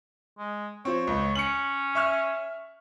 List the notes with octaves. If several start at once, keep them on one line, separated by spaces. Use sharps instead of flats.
G#3
F3 C4 C#5
C#2
C#4 C#7 F#7
E5 C#6 F6